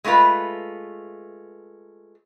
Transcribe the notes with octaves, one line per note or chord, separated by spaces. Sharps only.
G#3 A3 D#4 F4 B4